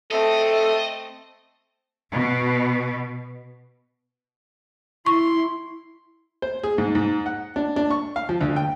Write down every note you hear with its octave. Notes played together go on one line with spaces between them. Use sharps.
A3 C4 A4 D#5 E5
B2
E4 C6 C#6
C5
G#4
G#2
G#2
F#5
D4
D4
C#6
F5
F3
D2
G5